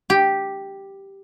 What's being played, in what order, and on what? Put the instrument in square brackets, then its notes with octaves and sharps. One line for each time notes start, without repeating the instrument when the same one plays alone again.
[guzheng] G4